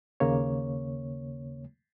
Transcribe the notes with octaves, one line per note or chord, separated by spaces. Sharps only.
D#2 C#3 A#3 C#5